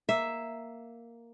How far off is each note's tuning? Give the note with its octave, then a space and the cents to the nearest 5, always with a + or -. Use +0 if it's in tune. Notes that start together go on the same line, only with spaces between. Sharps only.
A#3 +0 E5 +0